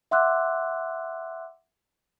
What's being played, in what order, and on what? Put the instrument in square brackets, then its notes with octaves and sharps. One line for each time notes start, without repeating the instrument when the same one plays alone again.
[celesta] E5 F#5 C6 D6 E6 F#6